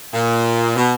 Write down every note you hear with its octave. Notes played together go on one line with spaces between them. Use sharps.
A#2
B2